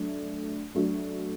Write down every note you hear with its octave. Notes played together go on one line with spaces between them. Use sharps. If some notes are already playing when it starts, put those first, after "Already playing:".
Already playing: F#3 A3 D4
F#3 A3 D4 F#4